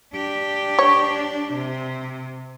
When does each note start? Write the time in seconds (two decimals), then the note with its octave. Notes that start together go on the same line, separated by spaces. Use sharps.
0.14 D4 G4
0.79 C#5
1.54 C3